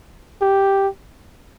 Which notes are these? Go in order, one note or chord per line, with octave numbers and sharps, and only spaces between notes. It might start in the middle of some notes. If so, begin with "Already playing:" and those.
G4